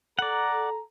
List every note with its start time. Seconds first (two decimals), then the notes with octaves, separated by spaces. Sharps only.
0.19 A4 D5 F#5 A#5